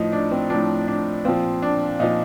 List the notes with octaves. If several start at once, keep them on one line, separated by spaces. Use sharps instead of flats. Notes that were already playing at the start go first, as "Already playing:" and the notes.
Already playing: A2 F3 D#4
D4
C4
A2 F3 D4
D4
A#2 F3 C4
D4
A#2 F3 D#4